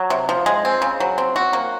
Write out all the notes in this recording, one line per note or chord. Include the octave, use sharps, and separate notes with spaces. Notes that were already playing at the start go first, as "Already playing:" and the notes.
Already playing: F#3
C3
F3
G#3
C4
C#3
F#3
C4
F#4
A#3